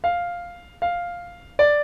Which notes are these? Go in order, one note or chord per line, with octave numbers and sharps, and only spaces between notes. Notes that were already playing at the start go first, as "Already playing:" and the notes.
F5
F5
D5